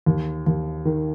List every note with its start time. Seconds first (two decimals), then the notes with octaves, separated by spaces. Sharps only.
0.06 D#2
0.46 D#2
0.85 D#3